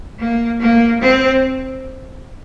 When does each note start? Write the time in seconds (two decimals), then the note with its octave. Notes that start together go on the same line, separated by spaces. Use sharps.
0.19 A#3
0.60 A#3
1.00 C4